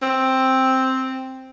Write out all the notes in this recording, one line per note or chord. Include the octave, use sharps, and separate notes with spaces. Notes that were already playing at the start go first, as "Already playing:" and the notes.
C4